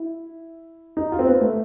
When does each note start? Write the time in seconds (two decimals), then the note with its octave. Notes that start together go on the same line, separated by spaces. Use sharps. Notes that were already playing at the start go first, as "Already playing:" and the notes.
Already playing: E4
0.97 D#4
1.12 F4
1.19 C4
1.27 B3
1.41 A3